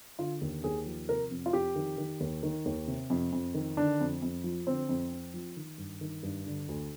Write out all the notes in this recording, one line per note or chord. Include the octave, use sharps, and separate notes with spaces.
D3 F4
D#2
D#2 G#4
F3
C3 A#4
F2
F4
F2 G4
D#3
D#3
D#2
D#3
D#2
C3
F2
F2
D#3
D3 D4
F2
F2
F3
D3 C4
F2
F2
F3
D#3
G2
D#3
G2
D3
D2